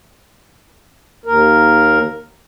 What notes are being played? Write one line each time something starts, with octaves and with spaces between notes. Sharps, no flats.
D#2 A#4